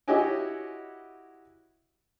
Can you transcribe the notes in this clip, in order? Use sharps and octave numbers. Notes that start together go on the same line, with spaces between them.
E4 F#4 G4 C#5 D#5 G#5